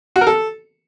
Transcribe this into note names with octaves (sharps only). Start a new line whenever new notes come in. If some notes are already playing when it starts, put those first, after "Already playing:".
F#4
A#4
A4